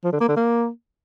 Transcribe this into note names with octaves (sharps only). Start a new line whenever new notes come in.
F3
D3
A#3
D3
A#3